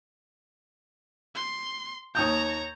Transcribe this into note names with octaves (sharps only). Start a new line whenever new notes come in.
C6
D#2 C#5 A#5 D#6 G6